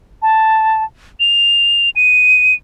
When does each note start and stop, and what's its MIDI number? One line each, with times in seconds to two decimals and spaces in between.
0.22 0.84 81
1.20 1.90 101
1.96 2.54 99